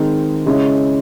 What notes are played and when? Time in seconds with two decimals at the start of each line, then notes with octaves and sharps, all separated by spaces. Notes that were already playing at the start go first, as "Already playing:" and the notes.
Already playing: D#3 G#3 C4
0.46 C#3 G#3 C#4 E4